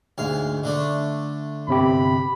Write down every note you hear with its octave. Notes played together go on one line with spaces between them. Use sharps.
D2 G#2 F5
D3 A3 D4
G1 C3 G4 B5